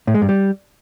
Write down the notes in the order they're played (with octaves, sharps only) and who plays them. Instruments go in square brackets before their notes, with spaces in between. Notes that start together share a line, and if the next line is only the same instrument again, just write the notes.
[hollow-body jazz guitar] A2
G#3
G2
G3